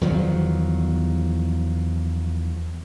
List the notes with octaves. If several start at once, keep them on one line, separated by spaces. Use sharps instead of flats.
E2 D#3 F3 F#3